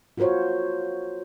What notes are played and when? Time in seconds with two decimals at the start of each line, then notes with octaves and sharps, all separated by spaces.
0.18 F4 F#4 A#4 C5 C#5